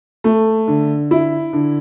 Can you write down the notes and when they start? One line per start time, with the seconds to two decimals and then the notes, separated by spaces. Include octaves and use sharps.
0.24 A3
0.68 D3
1.11 E4
1.53 D3